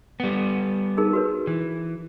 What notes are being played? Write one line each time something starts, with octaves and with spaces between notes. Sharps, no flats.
G3 B3
D#4 G#4 A#4
F#4 B4 C#5
E3